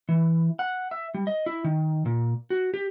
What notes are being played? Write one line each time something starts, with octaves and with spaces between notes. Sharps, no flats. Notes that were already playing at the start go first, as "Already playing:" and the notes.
E3
F#5
E5
G3
D#5
E4
D#3
A#2
F#4
G4